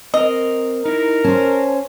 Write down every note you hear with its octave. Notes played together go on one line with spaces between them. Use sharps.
C4 A#4 D#5
D#4 E4 A#4
C#4 C5 A5